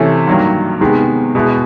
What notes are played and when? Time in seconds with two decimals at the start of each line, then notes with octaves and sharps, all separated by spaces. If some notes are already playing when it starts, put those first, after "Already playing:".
Already playing: C3 E3 A3 C#4 E4
0.27 G2 D#3 F#3 A#3
0.81 C3 D#3 G#3 B3
1.35 B2 G#3 B3 E4